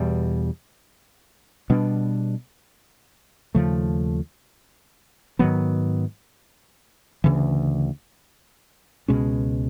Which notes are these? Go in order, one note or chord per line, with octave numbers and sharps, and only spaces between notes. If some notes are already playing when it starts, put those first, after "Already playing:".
Already playing: E2 B2 G3
B2 G3 B3 D4
D#2 C#3 F3 A3
G#2 D#3 F#3 B3
D2 C#3 E3
C#2 B2 G#3 C#4